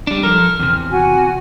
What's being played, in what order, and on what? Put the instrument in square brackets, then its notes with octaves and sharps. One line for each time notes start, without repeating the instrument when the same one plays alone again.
[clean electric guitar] G3 D4
[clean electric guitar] F3 A4 A#4 [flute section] F6
[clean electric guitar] E2 C3
[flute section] F#4 F#5 G#5